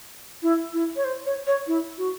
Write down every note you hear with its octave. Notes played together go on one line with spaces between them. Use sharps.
E4
E4
C#5
C5
C#5
C#5
E4
F#4